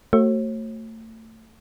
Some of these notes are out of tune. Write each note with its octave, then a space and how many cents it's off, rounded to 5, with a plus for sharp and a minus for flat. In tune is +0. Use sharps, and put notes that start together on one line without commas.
A3 +30 F#4 +25 C#5 -45